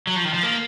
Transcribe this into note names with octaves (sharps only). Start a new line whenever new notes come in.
F#3
F3
D#3
F3
A#3